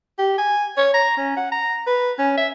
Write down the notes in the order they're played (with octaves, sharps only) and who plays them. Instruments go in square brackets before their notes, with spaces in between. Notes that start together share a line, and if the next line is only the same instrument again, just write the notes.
[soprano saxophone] G4
G#5
C#5
A#5
C#4
F#5
A#5
B4
C#4
E5